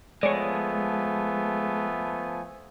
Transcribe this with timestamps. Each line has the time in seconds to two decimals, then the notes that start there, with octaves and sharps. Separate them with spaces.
0.23 F3 G#3 A3 B3 C#5 D5 G#5